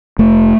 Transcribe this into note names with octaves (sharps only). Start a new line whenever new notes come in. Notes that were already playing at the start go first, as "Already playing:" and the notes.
F1 A3